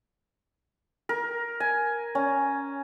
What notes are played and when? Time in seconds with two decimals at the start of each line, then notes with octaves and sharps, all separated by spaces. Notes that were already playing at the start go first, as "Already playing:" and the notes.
1.09 A#4
1.60 G#5
2.15 C#4